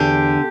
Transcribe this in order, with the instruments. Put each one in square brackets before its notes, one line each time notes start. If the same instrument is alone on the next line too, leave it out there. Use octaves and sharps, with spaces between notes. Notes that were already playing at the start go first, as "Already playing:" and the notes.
Already playing: [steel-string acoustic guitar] E2 D3 G4